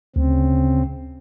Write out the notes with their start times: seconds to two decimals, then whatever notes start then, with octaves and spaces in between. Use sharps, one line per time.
0.16 D2 C#3 C4